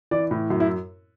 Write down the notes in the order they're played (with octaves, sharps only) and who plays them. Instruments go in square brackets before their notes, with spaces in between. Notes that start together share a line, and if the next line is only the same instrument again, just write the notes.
[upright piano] E3 D5
A2
F#2
E4